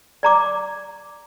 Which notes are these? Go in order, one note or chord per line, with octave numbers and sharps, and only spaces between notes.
D5 A#5 D6